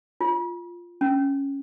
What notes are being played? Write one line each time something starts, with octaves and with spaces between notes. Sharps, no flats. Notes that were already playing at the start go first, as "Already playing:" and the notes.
F4
C#4